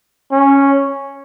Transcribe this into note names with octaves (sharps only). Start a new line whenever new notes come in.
C#4